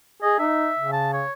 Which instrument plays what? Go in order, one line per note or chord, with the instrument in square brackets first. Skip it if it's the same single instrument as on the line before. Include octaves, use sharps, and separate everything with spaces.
[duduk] G#4 [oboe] D#5
[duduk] D#4 [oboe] E5
[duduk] C#3
[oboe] A5
C#5